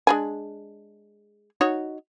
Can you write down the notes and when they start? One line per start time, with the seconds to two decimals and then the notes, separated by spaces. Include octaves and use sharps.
0.07 G#3 D4 G#5
1.61 D#4 F#4 C#5